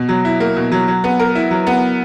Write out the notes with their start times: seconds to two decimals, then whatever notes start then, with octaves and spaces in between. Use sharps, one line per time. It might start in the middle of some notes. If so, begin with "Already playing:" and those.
Already playing: B2
0.09 F#3
0.25 E4
0.40 A#3
0.56 B2
0.72 F#3
0.88 F#3
1.04 B3
1.19 A#4
1.35 E4
1.51 F#3
1.67 B3